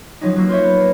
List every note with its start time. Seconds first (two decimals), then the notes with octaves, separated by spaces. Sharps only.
0.21 F3 F#3 C#4 D#4
0.36 F#3 A#3 E6
0.49 F4 C5 C#5 E5
0.63 B3
0.80 A#3